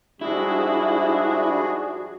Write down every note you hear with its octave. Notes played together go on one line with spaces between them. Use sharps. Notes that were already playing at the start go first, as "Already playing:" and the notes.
G#2 F3 G3 D4 E4 F#4 G#4